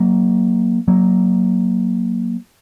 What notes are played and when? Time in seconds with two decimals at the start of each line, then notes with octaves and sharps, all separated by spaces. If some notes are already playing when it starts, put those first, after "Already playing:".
Already playing: F#3 A#3
0.88 F#3 A#3